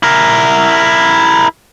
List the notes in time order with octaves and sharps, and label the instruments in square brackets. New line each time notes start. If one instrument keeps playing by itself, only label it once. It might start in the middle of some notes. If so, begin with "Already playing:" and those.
[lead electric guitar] E4 A#4